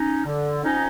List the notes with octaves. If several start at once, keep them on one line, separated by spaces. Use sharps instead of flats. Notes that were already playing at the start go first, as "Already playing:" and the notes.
Already playing: C#4 D#4
D3
F2 C#4 D#4